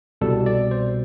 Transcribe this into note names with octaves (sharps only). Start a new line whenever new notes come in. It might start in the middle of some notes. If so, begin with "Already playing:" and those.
C2 B2 G3 A4
D5
C5